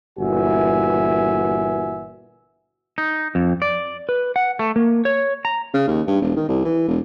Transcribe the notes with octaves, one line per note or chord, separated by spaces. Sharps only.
G1 A#2 E3 F#4 E5 G#5
D#4
F2
D5
B4
F#5
A3
A#3
C#5
A#5
C#3
D#2
G2
E1
D#3
C2
E3
E1